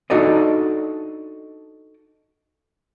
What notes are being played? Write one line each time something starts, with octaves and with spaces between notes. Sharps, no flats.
D4 D#4 F#4 A4 D5 D#5